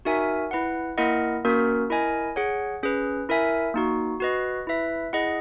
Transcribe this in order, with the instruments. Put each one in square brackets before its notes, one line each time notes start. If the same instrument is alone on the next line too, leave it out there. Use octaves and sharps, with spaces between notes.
[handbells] D#4 F#4 A#4 E5 G#5
E4 B4 F#5
A#3 E4 A#4 D#5 F#5
A#3 C#4 F#4 A#4
E4 A#4 D#5 G#5
G#4 C#5 F#5
C#4 G#4 B4
E4 A#4 E5 G#5
A#3 D#4 F#4
F#4 B4 D#5
E4 B4 E5
E4 G#4 D#5 F#5